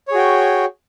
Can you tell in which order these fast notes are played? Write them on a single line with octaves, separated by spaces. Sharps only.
C#5 G#4 F#4 G5